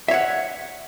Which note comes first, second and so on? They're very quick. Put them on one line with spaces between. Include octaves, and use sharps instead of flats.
E5 C#5 F#5